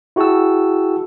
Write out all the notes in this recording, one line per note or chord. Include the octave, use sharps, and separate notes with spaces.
E4 F#4 G#4 G5 A5 E6